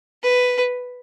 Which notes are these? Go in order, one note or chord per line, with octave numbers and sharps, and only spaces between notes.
B4